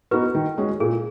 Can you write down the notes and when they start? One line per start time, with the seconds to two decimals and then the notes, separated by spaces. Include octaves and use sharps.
0.11 B3 D#4 F#4 B4
0.35 D#3
0.58 G#3 C#4 F#4
0.80 A#2 G#4